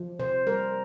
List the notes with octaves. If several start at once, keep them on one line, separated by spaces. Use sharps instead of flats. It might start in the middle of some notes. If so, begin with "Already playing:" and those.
Already playing: F3
C3 C5
G3 A#4